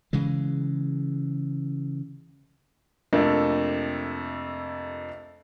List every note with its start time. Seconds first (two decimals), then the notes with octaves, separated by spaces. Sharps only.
0.13 C#3 E3 G#3
3.13 F2 C3 A3 A#3 D4